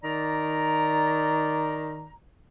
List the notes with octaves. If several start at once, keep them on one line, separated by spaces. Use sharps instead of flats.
D#3 D5 A#5